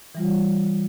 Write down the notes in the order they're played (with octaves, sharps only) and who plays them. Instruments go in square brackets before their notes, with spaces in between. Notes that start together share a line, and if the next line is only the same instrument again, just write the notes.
[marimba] E3 G3 F4